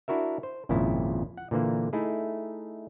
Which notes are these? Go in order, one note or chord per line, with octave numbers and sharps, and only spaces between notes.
D4 E4 F#4 A#4 E5
C5
G#1 F2 A#2 C#3 E4
F#5
A#2 D3 E3 A#3
A3 D#4 E4 G#4